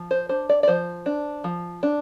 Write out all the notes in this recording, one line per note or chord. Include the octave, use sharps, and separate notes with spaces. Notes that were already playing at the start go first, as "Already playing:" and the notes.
Already playing: F3
C5
D4 C5
D5
D5
F3 C5
D4
F3
D4